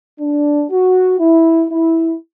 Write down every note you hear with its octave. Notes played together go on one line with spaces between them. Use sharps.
D4
F#4
E4
E4